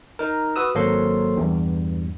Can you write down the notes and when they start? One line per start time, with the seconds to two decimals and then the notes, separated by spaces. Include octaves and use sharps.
0.19 D#4 A#4
0.56 F#4 B4 D#6 E6
0.75 G#1 F#3 A#3 A4 C5 C6
1.37 E2 G2